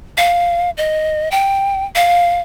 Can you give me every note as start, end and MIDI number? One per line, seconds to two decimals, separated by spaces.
0.17 0.70 77
0.77 1.29 75
1.31 1.85 79
1.95 2.41 77